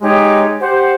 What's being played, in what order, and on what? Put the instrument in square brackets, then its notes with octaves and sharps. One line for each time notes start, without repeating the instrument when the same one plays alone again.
[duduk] G#3 [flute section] D#4 G4 C#5
[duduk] G4 [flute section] C5 F#5